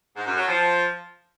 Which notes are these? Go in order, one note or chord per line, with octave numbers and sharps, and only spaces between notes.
G#2
F#2
F#3
F3